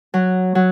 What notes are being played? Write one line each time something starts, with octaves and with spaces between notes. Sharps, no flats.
F#3
F#3